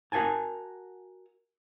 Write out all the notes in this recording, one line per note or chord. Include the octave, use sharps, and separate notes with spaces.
F#4 A#4 F#5 G#5 A5